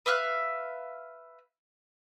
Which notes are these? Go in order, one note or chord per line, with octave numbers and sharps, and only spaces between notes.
B4 E5 F5 F#6